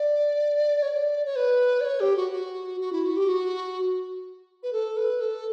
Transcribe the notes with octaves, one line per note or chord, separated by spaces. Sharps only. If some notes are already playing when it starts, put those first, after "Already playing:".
Already playing: D5
C#5
D5
C#5
B4
D5
C#5
G4
F#4
F#4
F#4
E4
F#4
G4
F#4
B4
A4
B4
A4